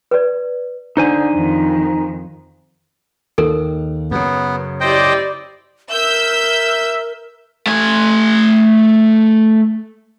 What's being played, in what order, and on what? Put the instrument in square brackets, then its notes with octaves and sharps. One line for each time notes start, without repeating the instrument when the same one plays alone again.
[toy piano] B4 D5
[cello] D3 [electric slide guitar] D#4 C5 G#5
[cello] F2 D#3
[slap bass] D#2 [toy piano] A4 A#4
[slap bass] F#2 C#3 [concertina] B3
[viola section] E4 G4 D5 [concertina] C5 D#5 G5
[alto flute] A#4 [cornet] E5 [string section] E6 G6
[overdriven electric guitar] A3 G#5